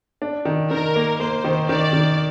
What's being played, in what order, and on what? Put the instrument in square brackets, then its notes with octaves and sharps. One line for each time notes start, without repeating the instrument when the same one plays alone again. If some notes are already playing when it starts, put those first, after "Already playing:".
[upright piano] D4
D#3
[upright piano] D#3 [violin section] A#4
[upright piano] A#3
[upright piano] A#3 [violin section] C5
[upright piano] D#3
[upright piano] D#3 [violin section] D5
[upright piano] D#3